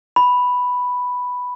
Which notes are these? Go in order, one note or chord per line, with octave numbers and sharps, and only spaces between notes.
B5